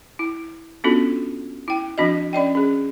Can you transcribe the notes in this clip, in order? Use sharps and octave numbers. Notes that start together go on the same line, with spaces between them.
E4
B3 C#4 D4 F4 F#4 A4
E4 G5
F3 C4 D4 F#4 D#5
C#4 D5 D#5 G5
C#4 G#4